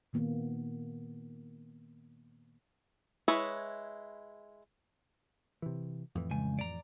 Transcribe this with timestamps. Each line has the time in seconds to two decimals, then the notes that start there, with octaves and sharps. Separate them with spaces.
0.13 A#2 D#3 A#3 B3
3.28 G#3 E4 B4 C#5
5.62 C3 E3
6.15 F2 A2 E3
6.31 C#2 G#5
6.59 D5 A#5